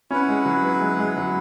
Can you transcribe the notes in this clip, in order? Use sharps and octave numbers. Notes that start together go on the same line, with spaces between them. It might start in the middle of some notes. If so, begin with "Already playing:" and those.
C#4 E4 B4 F#5
G#3
F#3
B3
G#3
G#3
F#3